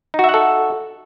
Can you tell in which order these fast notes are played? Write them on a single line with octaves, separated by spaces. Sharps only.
D#4 F#4 E5 F#5 A4